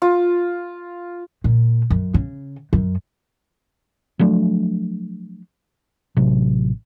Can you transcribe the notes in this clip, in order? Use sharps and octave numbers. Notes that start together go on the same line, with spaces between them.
F4
A#2
F#2
C#3
F#2
F3 F#3 A3 D4
A1 C3 F#3